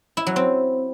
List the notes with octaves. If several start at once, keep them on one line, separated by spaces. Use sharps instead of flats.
E4
F#3
C4